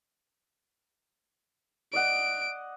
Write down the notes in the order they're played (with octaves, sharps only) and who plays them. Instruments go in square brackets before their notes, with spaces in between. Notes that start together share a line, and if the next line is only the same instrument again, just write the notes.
[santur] D5 D#5 F#5 [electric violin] D7